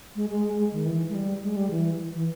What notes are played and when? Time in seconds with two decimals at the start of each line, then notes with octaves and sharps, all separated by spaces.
0.16 G#3
0.30 G#3
0.59 G#3
0.73 D#3
0.86 E3
1.09 G#3
1.15 G3
1.43 G#3
1.56 G3
1.71 E3
2.14 E3